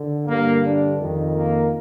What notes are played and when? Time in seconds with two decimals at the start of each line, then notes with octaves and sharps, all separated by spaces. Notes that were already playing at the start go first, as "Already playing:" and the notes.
Already playing: D3
0.28 G2 D3 A#3
0.64 D4
0.99 F2 D#3
1.34 A#3